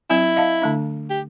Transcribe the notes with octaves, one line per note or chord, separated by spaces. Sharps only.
F#3 C4 E4
D#5 F5 A5
D3 A3 D4
G4